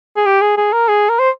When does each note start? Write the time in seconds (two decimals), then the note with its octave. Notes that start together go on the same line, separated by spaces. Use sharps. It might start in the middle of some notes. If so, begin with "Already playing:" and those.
0.17 G#4
0.26 G4
0.41 G#4
0.57 G#4
0.73 A#4
0.89 G#4
1.09 A#4
1.19 C5